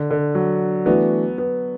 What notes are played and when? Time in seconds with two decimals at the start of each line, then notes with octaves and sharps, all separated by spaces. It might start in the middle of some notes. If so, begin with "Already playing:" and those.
Already playing: D3
0.11 D3
0.35 F#3
0.86 E3 A3 B3 D4 F#4
1.38 B3